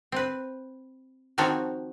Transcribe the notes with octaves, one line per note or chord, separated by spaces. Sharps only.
C4 B4
D#3 F3 C4 F#4 A4 C#5